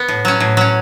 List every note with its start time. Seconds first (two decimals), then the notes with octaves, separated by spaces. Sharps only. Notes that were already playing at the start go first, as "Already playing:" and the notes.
Already playing: B3
0.08 A2
0.25 F#3 C#4
0.40 A2
0.57 F#3 C#4